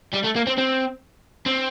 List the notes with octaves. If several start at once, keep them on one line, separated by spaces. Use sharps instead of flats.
G3
A3
A#3
C4
C4
C4